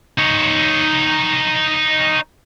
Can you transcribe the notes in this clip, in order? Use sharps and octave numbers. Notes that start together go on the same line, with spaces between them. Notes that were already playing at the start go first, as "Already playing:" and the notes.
D#4 C#5